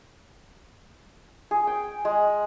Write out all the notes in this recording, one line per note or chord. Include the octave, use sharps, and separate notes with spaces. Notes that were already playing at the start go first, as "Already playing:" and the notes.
G#4
G5
G#3